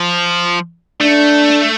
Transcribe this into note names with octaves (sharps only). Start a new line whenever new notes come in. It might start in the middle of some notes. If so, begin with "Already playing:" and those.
Already playing: F3
A3 D4